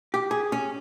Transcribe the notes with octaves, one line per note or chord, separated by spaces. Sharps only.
G4
G#4
C#4